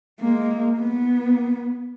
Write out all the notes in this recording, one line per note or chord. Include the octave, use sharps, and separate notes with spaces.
G#3 A#3
B3